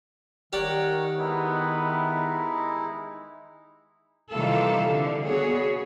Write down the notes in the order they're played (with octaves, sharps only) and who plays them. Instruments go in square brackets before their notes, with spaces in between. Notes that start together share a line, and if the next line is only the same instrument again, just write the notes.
[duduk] D#3 [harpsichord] G4 D5 [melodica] A#4 C#5 F#5
[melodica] G#3 D#4 E4 [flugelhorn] B3
[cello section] C3 D#3 E3 G3 F4 A4
D3
B3 F#4 G#4 C#5